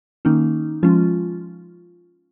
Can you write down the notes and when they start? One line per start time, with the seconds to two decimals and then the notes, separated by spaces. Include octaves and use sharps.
0.25 D#3 A#3 C#4 D#4
0.83 F3 G#3 C#4 F4